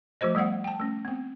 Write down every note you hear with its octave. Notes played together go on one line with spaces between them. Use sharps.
F3 A3 F#4 C5 D#5
G3 A3 B3 F5 F#5
G5 A5
A3 C#4
B3 C4